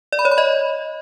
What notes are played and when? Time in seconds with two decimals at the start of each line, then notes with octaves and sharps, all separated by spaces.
0.12 D5
0.19 B5
0.25 C#5
0.31 B5
0.38 D#5